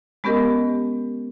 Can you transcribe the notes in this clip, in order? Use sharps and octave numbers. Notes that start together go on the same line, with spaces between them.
G#3 B3 C#4 G4 A#4 D#5